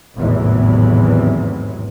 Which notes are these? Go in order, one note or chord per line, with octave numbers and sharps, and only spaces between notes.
G#1 E2 A2 C3 E3 F#3